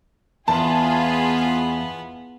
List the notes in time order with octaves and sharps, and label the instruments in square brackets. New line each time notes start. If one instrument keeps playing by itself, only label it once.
[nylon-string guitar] E2 [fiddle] B3 B4 [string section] F4 G#4 [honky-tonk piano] A5